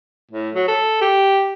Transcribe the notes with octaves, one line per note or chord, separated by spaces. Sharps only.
A2
F#3
A4
G4